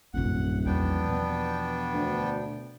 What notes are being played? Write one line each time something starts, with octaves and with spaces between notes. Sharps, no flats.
D#1 A#1 F#2 C3 F#5
E2 F3 B3 D4 G5
B2
D2